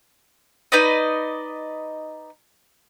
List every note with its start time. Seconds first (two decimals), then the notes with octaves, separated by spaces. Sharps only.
0.72 D#4 B4 D5 D#5